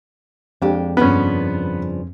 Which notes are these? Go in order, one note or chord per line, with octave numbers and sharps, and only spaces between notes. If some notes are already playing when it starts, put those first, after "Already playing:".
F2 G#3 D4 G4
G2 C#3 F3 B3 C#4